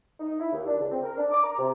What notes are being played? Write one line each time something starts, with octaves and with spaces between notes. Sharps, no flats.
D#4
E4
D#2
D4
C#2
C4
A#4
D4
D6
A#5
C3